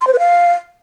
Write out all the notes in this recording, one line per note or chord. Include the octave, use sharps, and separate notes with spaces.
C6
C5
B4
F5